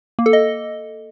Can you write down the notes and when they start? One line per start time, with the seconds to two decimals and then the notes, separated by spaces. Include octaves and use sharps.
0.19 A#3
0.26 A4
0.33 D#5